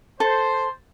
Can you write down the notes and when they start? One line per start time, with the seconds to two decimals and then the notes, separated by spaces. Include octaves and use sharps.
0.20 A4 C5